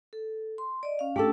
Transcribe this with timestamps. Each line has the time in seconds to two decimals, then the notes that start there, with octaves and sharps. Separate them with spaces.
0.13 A4
0.58 C6
0.83 D5 D#5
0.99 C#4 F5
1.16 A3 C#4 D4 G4 A4